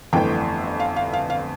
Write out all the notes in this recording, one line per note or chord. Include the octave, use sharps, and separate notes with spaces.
G1 F2 E3 A3 G5
F5
F5
F5
F5